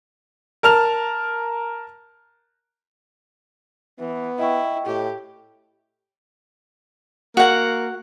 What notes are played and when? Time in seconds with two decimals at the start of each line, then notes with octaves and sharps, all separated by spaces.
0.63 A#4 A5 F6 F7
3.99 E3 B3
4.39 E4 D#5 G5 C#6
4.86 A2 G4
7.37 A#3 F#4 F#5